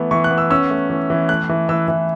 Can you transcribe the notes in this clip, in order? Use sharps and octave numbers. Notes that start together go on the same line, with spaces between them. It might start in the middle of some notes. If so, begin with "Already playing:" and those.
Already playing: E3 A3 B3
E3 C#6
F#6
B3
E6
C#4 E6
A3
E3
E3
A3 F#6
E3
E3 E6
E3